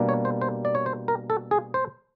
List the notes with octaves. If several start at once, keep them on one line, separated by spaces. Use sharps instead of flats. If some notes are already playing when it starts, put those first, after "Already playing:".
Already playing: B2 G3 A#3 D4
C#5
C5
C5
D5
C#5
C5
A#4
A4
G#4
C5